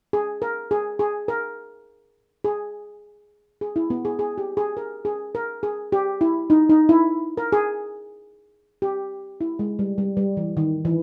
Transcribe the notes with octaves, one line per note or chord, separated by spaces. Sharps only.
G#4
A#4
G#4
G#4
A#4
G#4
G#4
E4
B3
G#4
G#4
G4
G#4
A#4
G#4
A#4
G#4
G4
E4
D#4
D#4
E4
A#4
G#4
G4
E4
G#3
G3
G3
G3
E3
D#3
E3